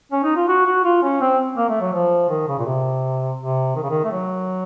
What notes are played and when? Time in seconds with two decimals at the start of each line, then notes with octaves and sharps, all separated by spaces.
0.12 C#4
0.23 D#4
0.36 F4
0.48 F#4
0.66 F#4
0.84 F4
1.03 C#4
1.21 C4
1.57 A#3
1.69 A3
1.81 F#3
1.93 F3
2.29 D#3
2.48 C#3
2.59 A#2
2.66 C3
3.39 C3
3.75 D#3
3.82 C#3
3.90 D#3
4.04 A3
4.11 F#3